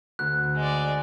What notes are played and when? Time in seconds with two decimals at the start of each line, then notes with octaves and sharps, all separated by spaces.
0.19 D2 F#6
0.57 G#3 D5